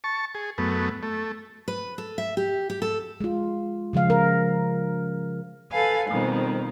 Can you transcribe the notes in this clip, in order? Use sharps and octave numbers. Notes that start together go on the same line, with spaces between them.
A5 C#6
G#4
F#2 A3 B3
A3
B4
A4
E5
G4
G4
A4
G#3 F4
C#3 F3 G#3 F5
A#4
A4 B4 F5 G#5
F2 B2 D#3 G3